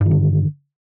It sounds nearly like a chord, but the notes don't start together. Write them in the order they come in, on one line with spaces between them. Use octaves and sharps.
G2 D#3 D3